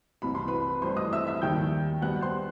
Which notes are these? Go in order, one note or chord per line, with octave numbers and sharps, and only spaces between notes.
C2 C3 E3 B5
C6
B4 B5
G2 E3 A3 C4 C5 C6
D#5 D#6
E5 E6
E5 E6
D#2 D#3 G3 G5 G6
B2 G3 B3 F#5 F#6
C5 C6